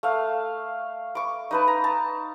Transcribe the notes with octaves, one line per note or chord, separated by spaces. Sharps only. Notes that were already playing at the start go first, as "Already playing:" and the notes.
A3 F5
C#6 D6
D#4 B4 A5
A#5
A5